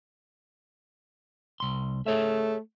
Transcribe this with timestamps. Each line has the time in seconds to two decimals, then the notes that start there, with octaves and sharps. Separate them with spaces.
1.60 C2 C6
2.06 A3 G#4 C#5 E5